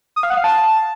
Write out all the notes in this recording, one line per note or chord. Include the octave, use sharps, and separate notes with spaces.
D#6
F5
F#5
F5
A5